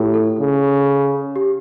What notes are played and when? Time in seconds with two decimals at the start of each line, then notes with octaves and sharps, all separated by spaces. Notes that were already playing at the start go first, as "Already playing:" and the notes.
Already playing: A2 F4 G4 A4
0.14 A4
0.39 C#3
1.36 G4